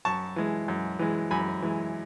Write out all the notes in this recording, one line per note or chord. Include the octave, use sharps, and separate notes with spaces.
F#2 A5 C#6
E3 G#3
F#2
E3 G#3
F#2 G#5 B5
E3 G#3